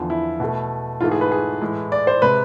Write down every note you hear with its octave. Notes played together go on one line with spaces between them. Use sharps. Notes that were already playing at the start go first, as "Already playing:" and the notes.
Already playing: E2 D3 F3
E4
B2 A3
G#2 E3 A3 F4
G#4
B4
G#4
A2 E3 G#3
D5
C5
C3 G#3 B4